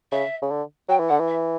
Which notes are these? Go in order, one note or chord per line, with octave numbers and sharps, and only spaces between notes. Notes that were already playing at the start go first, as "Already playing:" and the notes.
C#3 E5
C#3
D3
F#3 G5
E3
D3 F#5
E3
E5